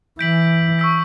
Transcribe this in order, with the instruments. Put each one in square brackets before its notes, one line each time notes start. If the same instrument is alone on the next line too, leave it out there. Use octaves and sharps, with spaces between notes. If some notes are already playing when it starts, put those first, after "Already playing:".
[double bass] E3 [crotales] G6 B6 D7 F#7
[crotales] C#6 E6 B6